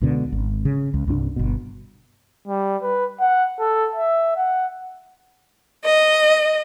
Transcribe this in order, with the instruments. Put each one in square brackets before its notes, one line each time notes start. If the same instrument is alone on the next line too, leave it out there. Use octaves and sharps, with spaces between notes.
[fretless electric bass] C#2 B2 D3
G#1
C#3
C#2
C2 G2 C#4 D4
G1 B2
[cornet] G3
B4
F#5
A4
E5
F#5
[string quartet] D#5